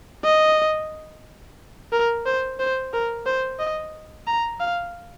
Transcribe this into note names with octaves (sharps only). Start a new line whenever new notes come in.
D#5
A#4
C5
C5
A#4
C5
D#5
A#5
F5